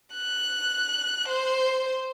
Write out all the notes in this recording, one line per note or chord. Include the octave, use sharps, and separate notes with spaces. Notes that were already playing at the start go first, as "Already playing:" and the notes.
F#6
C5